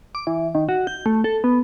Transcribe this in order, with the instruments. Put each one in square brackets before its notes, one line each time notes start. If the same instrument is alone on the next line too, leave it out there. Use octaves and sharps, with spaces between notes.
[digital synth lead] D6
E3
D#3
F#4
G6
A3
A4
B3